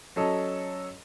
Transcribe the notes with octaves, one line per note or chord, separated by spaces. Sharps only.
F#3 C#4 A4 D#5